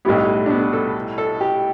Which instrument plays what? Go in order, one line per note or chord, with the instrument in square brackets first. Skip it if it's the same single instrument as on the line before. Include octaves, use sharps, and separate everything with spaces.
[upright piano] B1 A2 G3 E4 G4 [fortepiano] B3
[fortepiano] D4
B3
A4
A4
G4